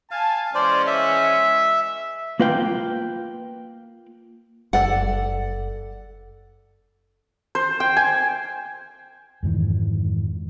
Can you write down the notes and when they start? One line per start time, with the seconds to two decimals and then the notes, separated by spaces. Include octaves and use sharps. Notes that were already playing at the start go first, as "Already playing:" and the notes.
0.11 F5 G#5 A5
0.55 E3 G#3 C#4 C5 D5
0.87 E5
2.40 A#3 F4 B4 F5 G5
4.73 F#1 A4 D5 F#5
7.55 C5
7.80 G5
7.97 G#5
9.43 F2 G#2 D#3 E3